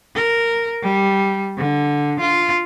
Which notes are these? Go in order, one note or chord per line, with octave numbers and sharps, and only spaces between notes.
A#4
G3
D3
F4